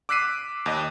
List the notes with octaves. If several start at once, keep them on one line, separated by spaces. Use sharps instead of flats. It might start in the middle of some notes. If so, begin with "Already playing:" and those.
D6 E6 F#6 B6 C7 D#7
D#2 D#5